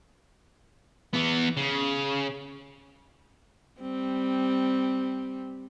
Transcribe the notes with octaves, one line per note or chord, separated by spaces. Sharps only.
E3 B3
C#3
G3 C4